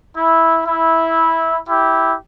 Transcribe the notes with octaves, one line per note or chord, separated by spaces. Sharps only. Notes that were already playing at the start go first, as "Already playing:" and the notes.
E4
E4
E4 G4